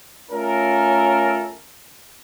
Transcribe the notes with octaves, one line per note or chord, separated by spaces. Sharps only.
A3 C#4 F4 A4 A#4